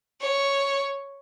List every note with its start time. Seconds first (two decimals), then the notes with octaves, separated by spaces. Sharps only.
0.21 C#5